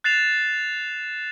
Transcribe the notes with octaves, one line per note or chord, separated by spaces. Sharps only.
F#6 A6 C7 E7 F7